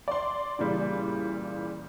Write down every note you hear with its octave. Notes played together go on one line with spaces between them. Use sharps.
D5 C6
A#2 C#3 E3 G3